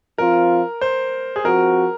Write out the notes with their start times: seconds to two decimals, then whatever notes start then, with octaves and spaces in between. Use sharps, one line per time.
0.18 F3 C4 F4 A#4
0.81 C5
1.36 G#4
1.44 F3 C4 F#4 A#4